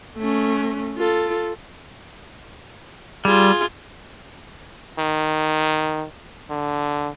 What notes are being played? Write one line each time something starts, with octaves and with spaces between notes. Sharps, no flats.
A3 C#4
F4 A4
G3 F4 G#4
D#3
D3